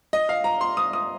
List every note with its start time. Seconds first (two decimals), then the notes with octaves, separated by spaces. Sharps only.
0.13 D#5
0.29 F5
0.44 A#5
0.61 C6
0.77 D#6
0.93 D#6